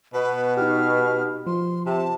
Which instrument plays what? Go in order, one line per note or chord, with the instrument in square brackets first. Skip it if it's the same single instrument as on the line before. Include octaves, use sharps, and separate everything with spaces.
[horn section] B2 [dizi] B4
[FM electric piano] D#4 F#4 G4 [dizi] F6
[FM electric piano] F3 [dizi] C6
[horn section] C3 [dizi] A5